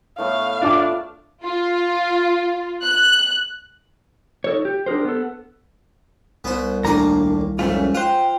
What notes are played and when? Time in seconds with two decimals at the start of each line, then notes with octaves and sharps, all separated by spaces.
0.18 A2 A3 B3 F5
0.61 D4 F4 D6
1.44 F4
2.84 F#6
4.44 D#4 A4 C#5
4.65 G4
4.86 D4 G4 G#4 A#4 C5
5.05 B3 A4
6.44 C2 B3 C5
6.84 D#2 A2 A#3 D4 G#5 A#5
7.59 F2 G#2 A3 C#4 F4
7.95 F4 C5 F#5 G5